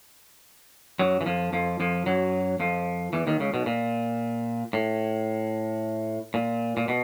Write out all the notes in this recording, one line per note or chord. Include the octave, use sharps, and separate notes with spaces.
F#2 F#3
E3
F2 F3
F2 F3
F2 F3
F#2 F#3
F2 F3
E2 E3
D#2 D#3
C#2 C#3
B1 B2
A#2
A2
A#2
A#2
B2